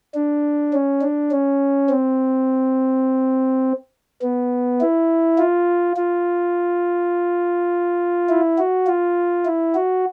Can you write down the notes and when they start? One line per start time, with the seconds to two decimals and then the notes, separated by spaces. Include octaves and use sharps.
0.15 D4
0.73 C#4
1.02 D4
1.31 C#4
1.89 C4
4.22 B3
4.81 E4
5.38 F4
5.97 F4
8.29 E4
8.58 F#4
8.87 F4
9.45 E4
9.75 F#4